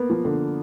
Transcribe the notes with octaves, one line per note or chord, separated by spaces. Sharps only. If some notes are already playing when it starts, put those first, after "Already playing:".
Already playing: A#3 B3
F3
D3